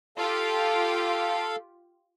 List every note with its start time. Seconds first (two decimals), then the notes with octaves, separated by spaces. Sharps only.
0.18 F4 G4 A4 F5